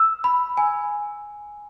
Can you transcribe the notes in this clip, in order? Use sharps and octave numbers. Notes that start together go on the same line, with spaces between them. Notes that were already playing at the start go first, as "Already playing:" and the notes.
Already playing: E6
B5
G#5